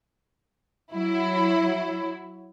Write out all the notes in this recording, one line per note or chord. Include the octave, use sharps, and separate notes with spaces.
F#3 E4